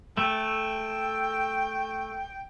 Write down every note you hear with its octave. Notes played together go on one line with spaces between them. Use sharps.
A3 G5